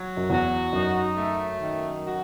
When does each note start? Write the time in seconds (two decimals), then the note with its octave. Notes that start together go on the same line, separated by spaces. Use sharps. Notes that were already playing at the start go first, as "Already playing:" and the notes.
Already playing: F#3
0.17 F#2
0.30 E2 F#4
0.73 F#2 D#4
1.16 A3
1.60 D#3
2.05 F#4